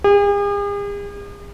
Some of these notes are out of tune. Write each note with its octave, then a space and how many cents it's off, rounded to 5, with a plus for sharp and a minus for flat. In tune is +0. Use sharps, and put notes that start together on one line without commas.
G#4 -45